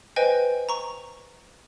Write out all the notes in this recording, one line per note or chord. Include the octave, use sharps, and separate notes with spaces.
B4 C5 D#5 G5 G#5
A#5 C#6